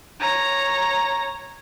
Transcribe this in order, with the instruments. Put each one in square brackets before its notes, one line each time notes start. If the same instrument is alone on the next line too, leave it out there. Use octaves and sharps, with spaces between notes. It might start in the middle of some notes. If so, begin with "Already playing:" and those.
[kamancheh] C#5 A#5